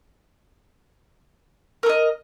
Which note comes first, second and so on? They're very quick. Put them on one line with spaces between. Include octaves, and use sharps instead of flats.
A#4 A4 D#5